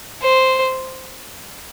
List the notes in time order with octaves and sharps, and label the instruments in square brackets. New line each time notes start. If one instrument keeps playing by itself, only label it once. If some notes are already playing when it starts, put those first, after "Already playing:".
[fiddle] C5